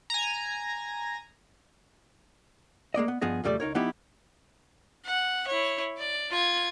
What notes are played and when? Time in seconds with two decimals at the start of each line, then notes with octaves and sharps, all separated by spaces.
0.10 G#5 A#5
2.94 G#3 A#3 D5 D#5
3.08 B3
3.21 G2 F3 B3 G#4 D#5
3.44 F2 C#3 G3 A3 D5
3.60 C#2 D#4 A#4 C#5
3.75 F3 B3 D#4 E4 G4
5.06 F#5
5.48 E4 C#5
5.98 D5
6.31 F4 G#6